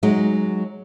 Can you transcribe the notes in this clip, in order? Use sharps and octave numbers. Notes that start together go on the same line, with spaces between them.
F#3 G#3 D#4